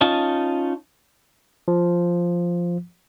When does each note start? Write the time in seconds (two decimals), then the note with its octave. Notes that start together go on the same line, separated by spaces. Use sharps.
0.01 C#4 D#4 F4 A5
1.68 F3